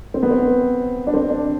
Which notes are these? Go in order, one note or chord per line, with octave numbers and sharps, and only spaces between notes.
C4
B3
C4
D4
C4
D4